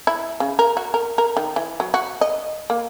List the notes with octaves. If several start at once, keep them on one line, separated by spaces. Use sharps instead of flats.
E4
C#3
A#4
F#4
A#4
A#4
D#3
E3
F#3
F#4
D#5
A#3